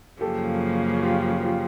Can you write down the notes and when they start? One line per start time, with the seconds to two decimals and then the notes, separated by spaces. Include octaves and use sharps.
0.21 F#2 C#3 F3 A#3 G4 A4
1.03 F4 G4
1.43 F4 G4